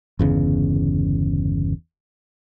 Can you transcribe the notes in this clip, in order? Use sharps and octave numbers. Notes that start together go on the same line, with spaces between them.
G1 E2 C#3